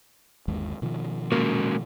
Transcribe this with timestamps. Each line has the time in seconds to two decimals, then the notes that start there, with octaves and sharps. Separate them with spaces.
0.48 G1 D#2 G#3
0.82 B2 D#3 F3
1.32 G#3 A#3 C#4 F#4